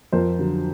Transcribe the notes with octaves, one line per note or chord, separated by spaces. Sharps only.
F2 A#4 C5
D3 F#3